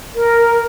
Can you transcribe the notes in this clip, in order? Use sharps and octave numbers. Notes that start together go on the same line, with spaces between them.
A#4